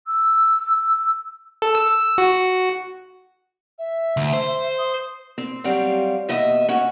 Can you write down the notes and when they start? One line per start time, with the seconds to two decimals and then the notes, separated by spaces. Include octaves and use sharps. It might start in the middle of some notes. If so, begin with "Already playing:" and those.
0.07 E6
1.62 A4
1.75 E6
2.18 F#4
3.79 E5
4.17 D2
4.33 C5
4.79 D#6
5.38 C4
5.64 F#3 G3 C4 F5
6.29 D#2 B2 D#5 E5
6.69 C#4 F#4